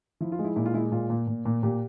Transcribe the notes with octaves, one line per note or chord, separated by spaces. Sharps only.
F3 E4
F4
G#3
E4
A#2 E4
F4
G#3 E4
A#2 F4
A#2
A#2
A#2
A#2 G4